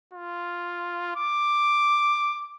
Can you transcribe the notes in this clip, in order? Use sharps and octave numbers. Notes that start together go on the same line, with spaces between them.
F4
D6